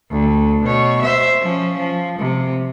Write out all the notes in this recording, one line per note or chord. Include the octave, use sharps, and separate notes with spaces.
D2
B2 C#5
C5 E5
F3 C#4
F3
C3